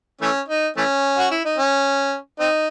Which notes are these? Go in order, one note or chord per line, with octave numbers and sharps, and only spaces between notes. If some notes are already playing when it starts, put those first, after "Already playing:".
E3 A3 C#4
D#4
E3 A3 C#4
F#4
E4
D#4
C#4
C4 D#4